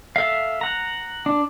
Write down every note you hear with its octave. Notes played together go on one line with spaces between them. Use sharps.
A4 E5 F5
F#5 A#5
D4